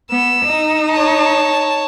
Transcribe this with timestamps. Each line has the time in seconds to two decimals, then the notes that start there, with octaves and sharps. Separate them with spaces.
0.10 B3 E6
0.45 D#4
0.91 C#5 A5